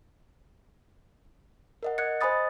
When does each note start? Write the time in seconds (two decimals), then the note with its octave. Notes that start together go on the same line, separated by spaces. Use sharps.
1.83 A#4 D#5 F#5
1.98 D#5 F#6 G#6 C#7
2.21 C5 D#5 G#5 B5 D#6 A6